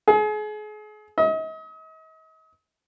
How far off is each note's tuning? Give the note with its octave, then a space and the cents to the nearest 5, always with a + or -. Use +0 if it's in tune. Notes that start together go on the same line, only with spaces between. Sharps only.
G#4 +35
D#5 +40